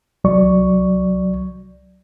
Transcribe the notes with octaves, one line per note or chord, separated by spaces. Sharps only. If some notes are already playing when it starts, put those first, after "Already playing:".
C2 F#3 D5 C#6